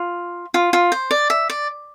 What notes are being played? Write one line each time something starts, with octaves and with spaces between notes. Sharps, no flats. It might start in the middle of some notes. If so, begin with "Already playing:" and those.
Already playing: F4
F4
F4
C5
D5
E5
D5